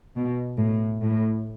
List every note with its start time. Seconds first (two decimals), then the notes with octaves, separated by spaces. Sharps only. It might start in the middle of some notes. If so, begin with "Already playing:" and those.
0.15 B2
0.58 A2
1.02 A2